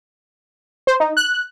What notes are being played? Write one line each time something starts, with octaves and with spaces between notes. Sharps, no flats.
C5
D#4
F#6